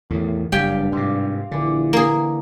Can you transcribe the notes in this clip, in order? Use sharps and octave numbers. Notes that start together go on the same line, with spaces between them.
E2 A2 D#3
F#1 G2 G3 G4 F5 G5 G#5
G#2 C3 C6 D6
A#1 D3 E3 D5
A#3 G#4